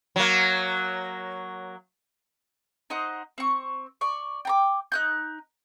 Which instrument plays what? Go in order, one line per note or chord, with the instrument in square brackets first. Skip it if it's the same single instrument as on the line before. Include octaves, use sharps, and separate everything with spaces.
[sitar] F#3 A#3
[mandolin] D#4 C5 D#5 F#5
C4 C#6
D5 C#6
G5 A#5 D6
D#4 F#6 G6